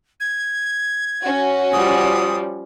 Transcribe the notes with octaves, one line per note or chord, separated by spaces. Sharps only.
G#6
C#4 F#4
F3 G3 D#6